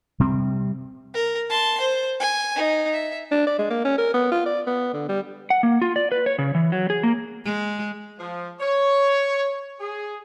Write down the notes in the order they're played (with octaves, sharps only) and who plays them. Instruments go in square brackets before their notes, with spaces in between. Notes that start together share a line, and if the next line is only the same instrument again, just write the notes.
[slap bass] C3 G3 C4
[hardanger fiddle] A#4
A5 C6
C5
G#5
D#4
E5
[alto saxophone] D4
D5
G#3
A#3
C#4
A#4
B3
F4
D5
B3
D3
G3
[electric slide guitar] F#5
A#3
F4
D5
B4
C#5
C#3
E3
F#3
G#4
A#3
[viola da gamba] G#3
[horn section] F3
C#5
G#4